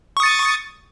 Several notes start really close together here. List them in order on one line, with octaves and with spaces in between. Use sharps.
C#6 D#6 A6